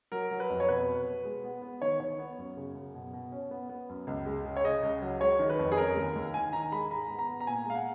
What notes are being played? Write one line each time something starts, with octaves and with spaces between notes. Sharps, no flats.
F#3 A#4
F#3
B4
F2
C#5
B2 B4
B2
B2
G#3
B3
B3
D#3 C#5
D#3 C#5
B3
F#2
C#3
F#2
B2
B2
C#4
B3
B3
F#2
C#2
G#3
C#3
C#5
C#3 D#5
C#2
F#3
G#3 C#5
D#3
B4
F2
G#4
C#4 A#4
D#2
D#2
D#3 G#5
D#3 A#5
G#3 B5
G#2 A#5
B3
A#5
B3
A#5
A#2 G#5
G#3 F5
F#5